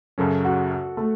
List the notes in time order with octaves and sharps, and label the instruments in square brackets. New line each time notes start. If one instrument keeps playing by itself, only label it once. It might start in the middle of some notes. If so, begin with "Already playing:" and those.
[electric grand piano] F#2 C#3 F#3 C#4 [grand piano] A4
[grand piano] F#4
F#4
A3